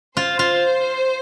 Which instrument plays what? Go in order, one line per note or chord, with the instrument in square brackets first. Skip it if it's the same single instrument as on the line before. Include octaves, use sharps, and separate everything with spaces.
[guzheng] F4 [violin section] C5
[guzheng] F4